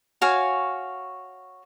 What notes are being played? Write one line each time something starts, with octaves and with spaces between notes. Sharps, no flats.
F#4 C#5 F5 G#5